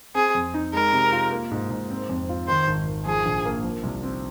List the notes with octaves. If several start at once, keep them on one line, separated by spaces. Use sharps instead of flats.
C4 G#4
F2
D#4
G#3 A#4
C3
F4
A#3
G#2
G#2
C4
F2
F4
D#3 C5
G#1
G#1
F3 G#4
A#1
A#3
F3
C2
C4